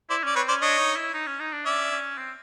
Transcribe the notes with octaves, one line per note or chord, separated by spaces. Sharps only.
E4 C5 D5
C#4 D5
C4 B4 C#5
C#4 C5 D5
D4 C#5 D#5
D#4
E4
D#4
C#4
D#4
D4
C#4 D5 E5
C#4
C4